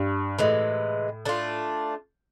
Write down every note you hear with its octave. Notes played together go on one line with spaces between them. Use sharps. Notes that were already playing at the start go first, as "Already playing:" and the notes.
Already playing: G2
A2 C3 E3 G#3
A3 D4 F4